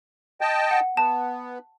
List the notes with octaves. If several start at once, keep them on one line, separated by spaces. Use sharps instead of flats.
D#5 G5 A5
F#5
B3 A5